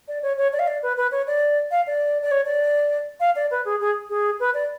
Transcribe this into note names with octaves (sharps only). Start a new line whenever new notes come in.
D5
C#5
C#5
D5
F5
D5
B4
B4
C#5
D5
F5
D5
D5
C#5
D5
F5
D5
B4
G#4
G#4
G#4
B4
D5